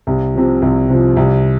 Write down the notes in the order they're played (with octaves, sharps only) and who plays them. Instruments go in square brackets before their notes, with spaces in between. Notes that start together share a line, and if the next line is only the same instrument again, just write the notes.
[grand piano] C2
C3 F3
C2
C3 F3
C2